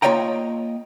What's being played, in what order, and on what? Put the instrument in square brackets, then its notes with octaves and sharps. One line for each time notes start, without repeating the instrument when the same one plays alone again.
[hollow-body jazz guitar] A#3 F4 C#5 D#5 G5 A#5